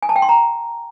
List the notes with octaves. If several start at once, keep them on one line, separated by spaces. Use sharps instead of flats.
G#5
A5
G5
C6
A#5